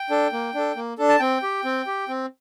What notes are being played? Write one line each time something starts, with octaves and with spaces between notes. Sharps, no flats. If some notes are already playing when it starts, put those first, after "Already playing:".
Already playing: G5
D4 A4
A#3
D4 A4
A#3
D4 A4
A5
C4 G5
G4
C4
G4
C4